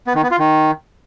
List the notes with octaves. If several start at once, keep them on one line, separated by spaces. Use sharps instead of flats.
B3
D#3
B3
F4
D#3